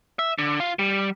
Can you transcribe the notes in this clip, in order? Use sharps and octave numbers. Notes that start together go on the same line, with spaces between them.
E5
D3
F4
G3